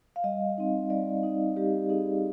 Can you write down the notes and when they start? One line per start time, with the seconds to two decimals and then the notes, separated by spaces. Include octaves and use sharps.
0.16 F5
0.24 G3 D#5
0.58 C4 D#4
0.90 G3 D5
1.23 C4 D#4
1.56 G3 G4
1.89 C4 D#4 G#4